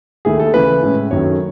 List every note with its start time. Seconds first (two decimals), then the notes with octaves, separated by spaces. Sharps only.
0.25 D#2 D#3 A3 E4 G#4
0.40 A4
0.54 C#3 E3 A3 C#4 B4
0.82 A2 G#3 C#4
1.11 F#2 D#3 F#3 A3 C#5